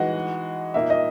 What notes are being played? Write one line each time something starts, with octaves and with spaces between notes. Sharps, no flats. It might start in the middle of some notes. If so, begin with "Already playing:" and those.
Already playing: E3 G#3 D#4 F#4 F#5
A#2 A#3 D#4 E5
D#5